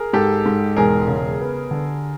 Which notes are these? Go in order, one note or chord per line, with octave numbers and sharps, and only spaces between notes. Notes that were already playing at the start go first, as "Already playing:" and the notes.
Already playing: G#4 A#4
G#2 G4 A4
G#2
E1 G#4 A#4
C#3
B3
D3